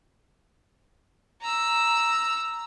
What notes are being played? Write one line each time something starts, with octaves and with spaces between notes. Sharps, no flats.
A#5 E6